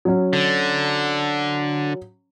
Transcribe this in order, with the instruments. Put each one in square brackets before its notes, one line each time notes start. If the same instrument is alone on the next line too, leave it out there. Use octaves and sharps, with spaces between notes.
[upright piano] F#3 C#4
[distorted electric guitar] D3